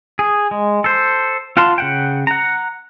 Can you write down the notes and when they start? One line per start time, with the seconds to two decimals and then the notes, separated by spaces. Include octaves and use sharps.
0.19 G#4
0.51 G#3
0.84 A4 C5
1.57 F4 F5 F#5 A5 C6
1.78 C#3 F#5 G5
2.27 F#5 A#5